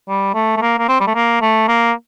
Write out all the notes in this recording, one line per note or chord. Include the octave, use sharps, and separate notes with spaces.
G3
A3
A3
A#3
A#3
C4
G3
A3
A#3
A3
A#3